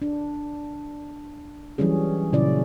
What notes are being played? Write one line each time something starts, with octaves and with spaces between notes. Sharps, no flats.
D4
E3 F#3 G3 C#4 G#4
A#2 C#3 F#3 C#4 E4 D5